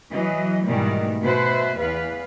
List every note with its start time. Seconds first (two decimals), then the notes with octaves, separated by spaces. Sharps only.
0.12 E3 F#3 D#5
0.66 G#2 B2 D#3 E3 G3 A3
1.23 B2 B4 C5 E5
1.79 E2 B3 B4 F5